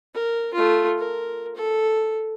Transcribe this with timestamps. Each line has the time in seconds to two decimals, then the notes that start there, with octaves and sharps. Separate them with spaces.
0.14 A#4
0.54 A3 F4
0.98 A#4
1.56 A4